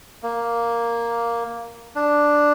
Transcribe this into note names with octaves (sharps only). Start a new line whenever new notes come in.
A#3
D4